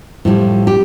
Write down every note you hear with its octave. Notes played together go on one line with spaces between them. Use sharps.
A2 F3 G3
G4